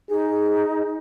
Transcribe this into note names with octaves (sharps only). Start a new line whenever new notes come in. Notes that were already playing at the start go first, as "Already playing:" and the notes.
D#4 G#4